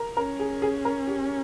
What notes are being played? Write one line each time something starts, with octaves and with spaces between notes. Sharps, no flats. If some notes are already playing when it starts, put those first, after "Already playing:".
Already playing: A#4
C#4 A#4
G#4
G#4
A#4
G4